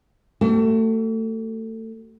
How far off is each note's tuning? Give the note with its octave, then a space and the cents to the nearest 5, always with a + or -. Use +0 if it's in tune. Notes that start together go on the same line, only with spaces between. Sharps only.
A3 +25 F#4 +45